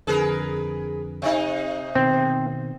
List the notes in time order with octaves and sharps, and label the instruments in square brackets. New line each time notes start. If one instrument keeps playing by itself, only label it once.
[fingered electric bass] F2 D3 [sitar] G#4 A#4 B4
[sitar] C3 D#4
[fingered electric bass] B2 D#3 [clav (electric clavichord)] C4